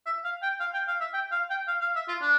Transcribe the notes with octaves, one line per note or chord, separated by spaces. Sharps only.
E5
F5
G5
F5
G5
F5
E5
G5
F5
G5
F5
F5
E5
F4
D4